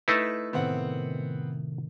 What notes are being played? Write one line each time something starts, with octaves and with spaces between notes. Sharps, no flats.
A3 D#4 E4 B4
A2 C3 D#3 B3 C4 F#5